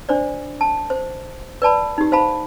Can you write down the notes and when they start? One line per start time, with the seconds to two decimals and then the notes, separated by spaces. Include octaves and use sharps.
0.09 D4 C5 D5
0.61 A5
0.90 C5
1.62 B4 D5 A5 B5
1.98 D#4 G4
2.12 C5 F5 A5 B5